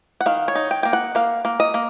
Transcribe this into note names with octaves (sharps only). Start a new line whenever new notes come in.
F#5
D#3 F5
C#5
D#4
G5
A#3 G5
F#5
A#3 F5
A#3
D#5
A#3